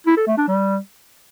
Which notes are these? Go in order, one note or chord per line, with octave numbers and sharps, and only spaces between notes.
E4
A4
A3
D4
G3